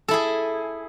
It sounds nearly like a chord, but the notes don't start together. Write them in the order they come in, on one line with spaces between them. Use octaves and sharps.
A4 E4 G#4